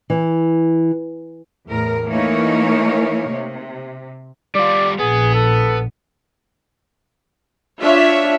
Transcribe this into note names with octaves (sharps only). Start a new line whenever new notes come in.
E3
E2 A2 A#4
E3 A3 A#3 D#4 A#4 C#5
C3
G3 F4 D5
A#1 B3 G#4
A4
D4 F4 C#5 E5